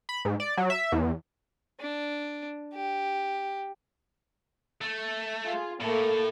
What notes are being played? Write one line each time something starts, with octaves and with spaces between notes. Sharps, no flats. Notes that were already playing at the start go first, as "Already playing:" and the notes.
B5
G#2
D5
F#3
E5
E2
D4
G4
A3
F4 G#4
A2 A3 A#3